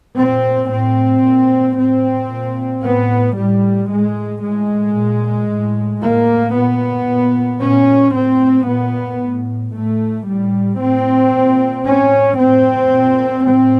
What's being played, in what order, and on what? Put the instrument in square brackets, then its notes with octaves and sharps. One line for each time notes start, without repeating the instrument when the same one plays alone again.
[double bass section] A#2 C4
A2 C4
A#2
A2 C4
A#2
A2 B3
A2 G3
A2 G#3
A2 G#3
A#2
A2
A2 A#3
A#2 B3
A#2
A#2 C#4
A2 C4
A#2 B3
A2
A2 A3
A2 G3
A2 C4
A#2
A2 C#4
A2 C4
A#2
A2 C4